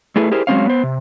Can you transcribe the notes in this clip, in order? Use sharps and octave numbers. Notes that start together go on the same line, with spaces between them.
A3 E4 G#4 A4 B4
E4 G4 G#4 A#4 C5
F#3 G#3 C4 C#4 C#5 F5
B3 C5
C3